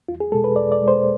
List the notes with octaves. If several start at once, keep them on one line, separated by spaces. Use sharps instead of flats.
E2 F4
G#4
B2 G#3 A4
B4
E2 D5
D5
B2 G#3
C5